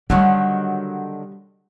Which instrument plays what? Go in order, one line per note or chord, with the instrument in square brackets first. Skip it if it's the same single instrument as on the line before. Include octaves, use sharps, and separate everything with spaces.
[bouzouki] D3 D#3 F#3 [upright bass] G3